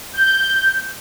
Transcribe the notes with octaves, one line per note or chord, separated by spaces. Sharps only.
G6